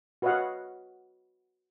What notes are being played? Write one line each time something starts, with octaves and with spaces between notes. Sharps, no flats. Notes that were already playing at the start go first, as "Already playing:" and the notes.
F#4 B4 C#5 D#5 F5 F#5